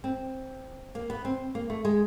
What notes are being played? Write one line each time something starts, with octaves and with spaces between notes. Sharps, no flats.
C4
A#3
B3
C4
A#3
A3
G#3